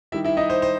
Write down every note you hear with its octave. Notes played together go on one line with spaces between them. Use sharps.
D#3 G3 D#4 E4 E5
E4 E5
D#4 D#5
C5
C5